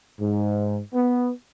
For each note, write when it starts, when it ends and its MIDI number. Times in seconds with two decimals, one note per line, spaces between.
0.21 0.79 44
0.94 1.30 59